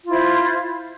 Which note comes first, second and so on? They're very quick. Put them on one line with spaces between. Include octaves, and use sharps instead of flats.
F4 E4 C5